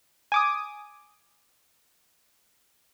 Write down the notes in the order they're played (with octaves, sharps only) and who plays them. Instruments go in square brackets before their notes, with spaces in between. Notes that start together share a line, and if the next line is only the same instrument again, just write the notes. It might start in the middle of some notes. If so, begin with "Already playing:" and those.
[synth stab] G#5 D6 D#6